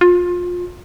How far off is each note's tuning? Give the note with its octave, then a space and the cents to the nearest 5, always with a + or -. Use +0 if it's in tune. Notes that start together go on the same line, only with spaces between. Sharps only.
F4 +25